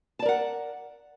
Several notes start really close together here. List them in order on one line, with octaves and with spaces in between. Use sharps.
A5 D5 A#4 F#5